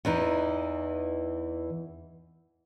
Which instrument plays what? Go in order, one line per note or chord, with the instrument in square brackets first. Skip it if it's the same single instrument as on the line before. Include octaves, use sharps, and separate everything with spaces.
[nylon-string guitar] E2 E3 D#4